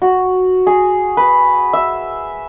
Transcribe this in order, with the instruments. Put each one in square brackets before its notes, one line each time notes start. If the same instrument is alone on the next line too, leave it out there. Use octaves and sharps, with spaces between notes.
[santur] F#4
G#4
B4
E5